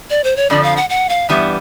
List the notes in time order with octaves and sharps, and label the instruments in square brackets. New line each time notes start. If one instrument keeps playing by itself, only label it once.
[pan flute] D5
C5
C#5
[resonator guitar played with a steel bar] F2 D3 F3 [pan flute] D5
[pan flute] F5
F#5
F#5
F5
[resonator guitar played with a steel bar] G2 E3 G3 B3 [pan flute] E5